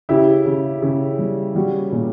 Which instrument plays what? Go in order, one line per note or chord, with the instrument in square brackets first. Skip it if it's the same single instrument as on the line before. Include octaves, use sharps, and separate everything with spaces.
[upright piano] C#3 E4 G4
C#3
C#3
G3
G3 F#4
A#2